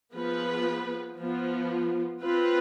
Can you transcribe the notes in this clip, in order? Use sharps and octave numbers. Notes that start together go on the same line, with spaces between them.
F3 B3 F4 G#4 B4
F3 B3 F4
C4 F4 B4